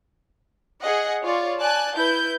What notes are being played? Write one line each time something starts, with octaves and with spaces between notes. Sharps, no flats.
G#4 D#5 F#5
F4 C#5 D5
D5 G#5 A5 F#6
E4 B4 G6